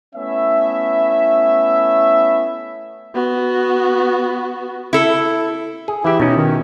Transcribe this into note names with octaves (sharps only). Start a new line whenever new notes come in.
A3 B3 C#4 E4 E5
B3 F#4
E4 A4
G#4
E3 E4 G4
B2 C#4 D#4
D#3